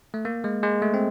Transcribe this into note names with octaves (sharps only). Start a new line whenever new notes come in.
A3
A#3
G#3
G#3
A3
C4